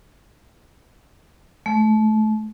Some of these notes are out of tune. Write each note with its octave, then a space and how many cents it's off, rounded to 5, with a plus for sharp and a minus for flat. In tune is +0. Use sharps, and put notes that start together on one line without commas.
A3 -25